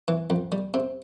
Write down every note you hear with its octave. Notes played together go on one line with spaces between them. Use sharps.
E3
F2
G3
C3